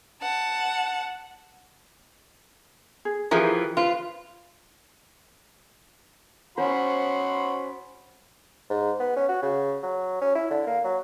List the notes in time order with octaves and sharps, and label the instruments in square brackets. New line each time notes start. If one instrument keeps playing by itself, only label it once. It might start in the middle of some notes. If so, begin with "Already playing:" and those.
[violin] F#5 A5
[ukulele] G#4
[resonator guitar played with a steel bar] E3 F3 [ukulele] G4 G#4 A#4
[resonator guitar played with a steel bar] F4 [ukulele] B4 C5
[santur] C#4 C5 [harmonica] F#4 B5 C6
[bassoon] G#2
B3
C#4
F#4
C#3
F#3
C#4
E4
D3
A#3
F#3